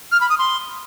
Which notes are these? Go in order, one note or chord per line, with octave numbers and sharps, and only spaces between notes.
F6
B5
D#6
C6